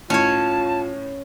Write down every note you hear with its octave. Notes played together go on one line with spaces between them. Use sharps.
A2 C#4 F4 C#5 A5